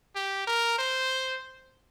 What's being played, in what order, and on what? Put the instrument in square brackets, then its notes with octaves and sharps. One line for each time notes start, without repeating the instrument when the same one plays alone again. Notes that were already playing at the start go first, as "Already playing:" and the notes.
[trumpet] G4
A#4
C5